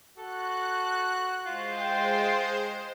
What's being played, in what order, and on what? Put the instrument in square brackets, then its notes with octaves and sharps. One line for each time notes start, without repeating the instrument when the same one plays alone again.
[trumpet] F#4 [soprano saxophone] A4 [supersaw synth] F#6
[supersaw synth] G#3 C5 [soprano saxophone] F4
[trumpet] G5